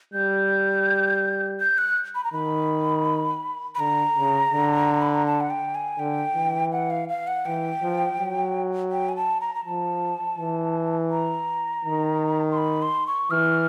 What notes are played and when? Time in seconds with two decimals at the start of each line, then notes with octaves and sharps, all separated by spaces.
0.14 G3 G6
1.61 G6
1.78 F#6
2.15 B5
2.24 A#5
2.33 D#3 B5
3.75 B5
3.79 D3 A#5
4.17 C#3
4.53 D3
5.02 B5
5.14 A#5
5.26 A5
5.41 F#5
5.50 G5
5.75 G#5
5.99 D3 G5
6.35 E3
6.72 F#5
6.90 F5
7.09 F5
7.27 F#5
7.46 E3 G5
7.82 F3
8.19 F#3
8.92 G5
9.09 G#5
9.17 A5
9.41 A#5
9.55 A#5
9.65 F3 A5
10.38 E3
11.11 A#5
11.85 D#3
12.52 C6
12.58 B5
12.82 C6
13.07 C#6
13.31 E3 F6